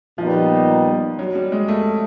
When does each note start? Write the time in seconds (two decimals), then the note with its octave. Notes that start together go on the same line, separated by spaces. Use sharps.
0.18 A#2 F3 G3 B3 D#4
1.19 F#3
1.35 G3
1.52 G#3
1.69 A3